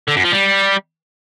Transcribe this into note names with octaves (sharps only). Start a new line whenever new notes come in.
D3
F#2
F3
G3